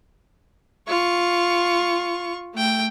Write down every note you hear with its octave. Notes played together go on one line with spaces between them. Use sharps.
F4 C#6
A3 G5